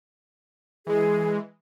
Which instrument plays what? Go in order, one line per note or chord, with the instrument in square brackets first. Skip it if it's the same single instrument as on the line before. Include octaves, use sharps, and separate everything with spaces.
[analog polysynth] E3 G#3 [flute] G#4